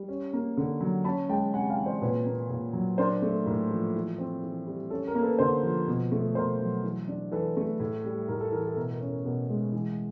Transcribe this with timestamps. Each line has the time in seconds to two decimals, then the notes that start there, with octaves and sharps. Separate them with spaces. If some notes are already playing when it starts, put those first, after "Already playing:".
Already playing: G3
0.09 C#4
0.33 A#3
0.57 D3
0.80 F#3
1.04 C#4 A5 B5
1.29 G#3 G5 A5
1.53 C3 F#5 G#5
1.70 F5 G5
1.78 E3
1.86 C5 D5
2.01 A#2 B4 C#5
2.26 A#3
2.50 A#2
2.73 F#3
2.98 D4 A#4 C5
3.22 A3
3.46 A2 A#4
3.71 F3
3.95 E3
4.18 C4
4.43 E3
4.67 G3
4.90 C#4 A4
5.07 A#4
5.15 A#3
5.22 A4 B4
5.39 D3 A#4 C5
5.63 F3
5.87 B2
6.11 A3
6.35 B2 A#4 C5
6.59 F#3
6.84 E3
7.08 D4
7.31 E3 A4 B4
7.57 A3
7.80 A2
8.05 G3
8.28 A2 A#4
8.41 A4
8.52 E3 A#4
8.65 A4
8.76 B2 A#4
8.92 A#4
9.01 C#4
9.09 A#4
9.24 B2 A#4
9.49 G#3
9.73 E3